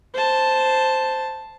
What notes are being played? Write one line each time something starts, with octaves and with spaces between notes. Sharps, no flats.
C5 A5